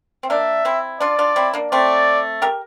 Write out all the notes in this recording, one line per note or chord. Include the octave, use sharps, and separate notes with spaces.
C4
A#3 D4 E5
C4 E4
D4 F4 D5
D4 F4
C4 E4
A#3 D4
A3 C4 D5
G4 A#4